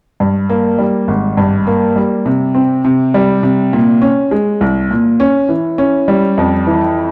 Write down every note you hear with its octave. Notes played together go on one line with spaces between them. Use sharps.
G2
A#3
G3
G#1
G2
A#3
G3
C3
C4
C3
G3
C3
A#2
C#4
G#3
C2
A#2
C#4
E3
C#4
G3
F2
E3